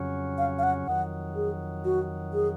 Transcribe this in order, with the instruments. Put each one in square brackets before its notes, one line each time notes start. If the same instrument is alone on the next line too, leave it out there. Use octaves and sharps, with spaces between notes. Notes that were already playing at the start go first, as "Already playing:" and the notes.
Already playing: [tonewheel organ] F2 C#3 F#3 C#4
[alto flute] F5
F5
F#5
[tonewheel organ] F2 D#3 F#3 [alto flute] F#5
[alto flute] G#4
F#4
G#4